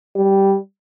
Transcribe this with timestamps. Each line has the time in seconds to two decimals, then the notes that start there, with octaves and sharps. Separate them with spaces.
0.16 G3